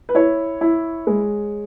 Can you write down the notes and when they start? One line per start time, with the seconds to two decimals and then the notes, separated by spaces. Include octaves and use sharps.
0.09 B4
0.15 E4 C#5
0.61 E4
1.07 G#3